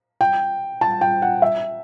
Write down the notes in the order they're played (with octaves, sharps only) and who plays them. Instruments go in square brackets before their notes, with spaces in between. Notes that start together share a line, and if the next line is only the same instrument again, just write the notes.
[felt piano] G5
A5
G5
F#5
E5